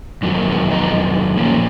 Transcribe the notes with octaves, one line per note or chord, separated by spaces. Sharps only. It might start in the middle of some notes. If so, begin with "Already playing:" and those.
F2 D#3 F#3
A#3
G#3 B3
B3 D#4
A#2 F3 A#3 C#4